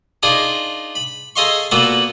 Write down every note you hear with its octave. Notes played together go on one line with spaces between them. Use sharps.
D4 D#4 F4 G#4 A#4
B5
G#4 A4 D#5 F5 C6 C#6
A#2 A#3 B3 F#4 A4 B4